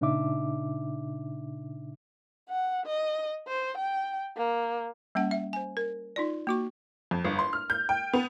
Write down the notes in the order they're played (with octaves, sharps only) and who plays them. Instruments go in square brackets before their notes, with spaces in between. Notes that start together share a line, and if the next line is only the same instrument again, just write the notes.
[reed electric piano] A#2 C#3 D4 D#4 E5 D6
[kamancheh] F#5
D#5
C5
G5
A#3
[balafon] G3 A#3 C#4 F#5
E5
C5 G#5
A#4
D#4 F4 D5
A#3 F#4 C#6
[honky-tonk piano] F2
G1
C6
F6
G6
G5
B3